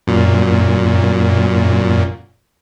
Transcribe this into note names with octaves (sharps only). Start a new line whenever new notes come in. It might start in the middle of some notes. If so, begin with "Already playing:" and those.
F#2 A#2